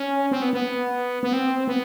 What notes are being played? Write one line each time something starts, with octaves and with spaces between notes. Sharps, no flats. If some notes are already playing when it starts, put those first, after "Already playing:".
Already playing: C#4
C4
B3
B3
B3
C4
B3